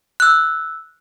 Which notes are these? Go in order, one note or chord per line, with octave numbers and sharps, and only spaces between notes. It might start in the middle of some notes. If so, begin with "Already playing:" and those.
E6 F#6